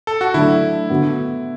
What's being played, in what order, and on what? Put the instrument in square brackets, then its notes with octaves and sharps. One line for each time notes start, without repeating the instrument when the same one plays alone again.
[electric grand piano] A4
F#4
[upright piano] D3 F#3 A3 D4 [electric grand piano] E4
[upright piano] D3 B3 F#4